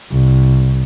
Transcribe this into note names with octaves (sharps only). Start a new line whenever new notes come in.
C2